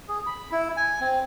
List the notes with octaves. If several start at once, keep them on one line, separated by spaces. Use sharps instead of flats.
G#4
B5
E4
G#5
C4